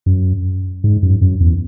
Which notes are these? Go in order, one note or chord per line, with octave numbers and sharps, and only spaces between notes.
F#2
G#2
F#2
F#2
E2